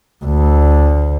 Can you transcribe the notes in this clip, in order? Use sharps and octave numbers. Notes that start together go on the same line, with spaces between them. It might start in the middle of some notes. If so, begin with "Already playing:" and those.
D2